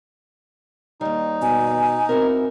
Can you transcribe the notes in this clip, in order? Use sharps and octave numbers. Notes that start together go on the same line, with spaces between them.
D#2 G3 D#4
B2 G#5
C4 E4 F#4 A#4